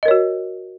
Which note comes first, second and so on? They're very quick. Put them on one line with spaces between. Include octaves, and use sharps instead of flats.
D#5 A#4 C#5 F#4